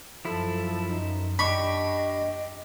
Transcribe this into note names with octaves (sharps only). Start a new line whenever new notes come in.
F#2 F3 E4 A4
D#4
D4 G4 D#5 B5 C#6